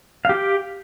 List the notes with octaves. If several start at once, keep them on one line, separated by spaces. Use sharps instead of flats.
G4 F5 G5